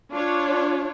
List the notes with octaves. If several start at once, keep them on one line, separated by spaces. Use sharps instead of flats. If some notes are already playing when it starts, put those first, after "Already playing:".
D4 F4 C#5